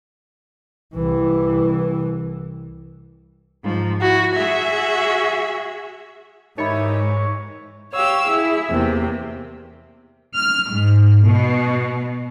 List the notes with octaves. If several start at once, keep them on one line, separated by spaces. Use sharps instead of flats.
C2 E3
G#2 F3
E4 F#4
F#4 G#4 E5
G#2 D#3 E3 D#4 G4 C#5 E5 B5
G4 C#5 F5 E6
E4 G#4
E2 C3 A#3 C4
F6
G#2
B2